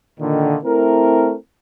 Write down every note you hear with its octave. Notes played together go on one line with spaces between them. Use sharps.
A#2 D3 D#3
A3 C4 E4 A#4